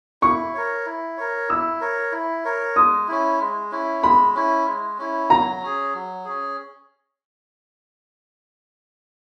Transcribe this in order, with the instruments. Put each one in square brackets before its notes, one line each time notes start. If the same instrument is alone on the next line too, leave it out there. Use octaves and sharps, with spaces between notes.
[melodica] E4 [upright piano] C#6
[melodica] A#4 C#5
E4
A#4 C#5
[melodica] E4 [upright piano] E6
[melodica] A#4 C#5
E4
A#4 C#5
[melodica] G#3 [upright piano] D#6
[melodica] C#4 E4
G#3
C#4 E4
[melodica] G#3 [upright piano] B5
[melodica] C#4 E4
G#3
C#4 E4
[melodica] F#3 [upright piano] A#5
[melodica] C#4 G#4
F#3
C#4 G#4